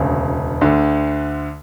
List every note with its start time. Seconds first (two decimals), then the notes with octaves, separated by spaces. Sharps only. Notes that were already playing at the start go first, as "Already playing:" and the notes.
Already playing: E1 D2 C#3
0.61 D2 D3